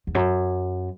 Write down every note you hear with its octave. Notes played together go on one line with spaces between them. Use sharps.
E2
F#2